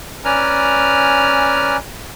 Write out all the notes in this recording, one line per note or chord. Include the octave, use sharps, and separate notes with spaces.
C#4 B4 D5 G#5 A#5 F6